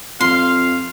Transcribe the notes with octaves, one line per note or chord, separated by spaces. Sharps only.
F2 F5 C6